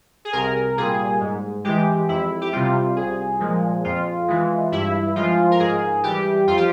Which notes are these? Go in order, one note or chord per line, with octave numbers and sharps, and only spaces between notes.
G#4
C2 A#4
A#2 G3 G#4
G#2
E3 G#3 G4
F2 E4
G4
C3 G3 F4
C2 G#4
A#2 F3 G#3
F2 F4
E3 G#3
G2 E4
F3 G#3 F4
A#4
G#2 G#4
E3 G3 G4
F2 F4
G4